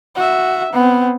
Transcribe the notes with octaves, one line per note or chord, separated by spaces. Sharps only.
F#4 E5
B3 C4